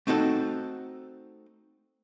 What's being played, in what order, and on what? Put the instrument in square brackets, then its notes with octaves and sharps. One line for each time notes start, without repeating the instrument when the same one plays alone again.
[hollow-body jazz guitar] A3 C4 D#4 F#4 A4